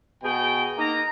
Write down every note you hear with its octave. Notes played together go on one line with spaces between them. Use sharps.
B2 G#4 G5
A#3 D#4 A#5